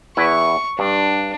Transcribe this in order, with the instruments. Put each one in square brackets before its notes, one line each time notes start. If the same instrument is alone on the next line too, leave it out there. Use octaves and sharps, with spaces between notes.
[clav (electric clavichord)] E2 E4 B4 [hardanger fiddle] C#6
[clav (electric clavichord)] G2 [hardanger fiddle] D4